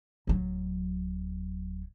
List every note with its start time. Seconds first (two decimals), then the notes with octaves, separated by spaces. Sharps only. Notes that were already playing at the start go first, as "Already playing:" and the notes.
0.27 D1 F#3